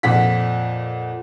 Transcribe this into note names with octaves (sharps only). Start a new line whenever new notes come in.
F2 A#2 F#5 B6